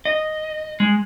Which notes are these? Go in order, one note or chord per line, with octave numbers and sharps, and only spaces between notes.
D#5
G#3